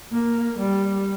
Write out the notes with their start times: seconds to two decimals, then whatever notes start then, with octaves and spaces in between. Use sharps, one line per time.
0.12 A#3
0.58 G3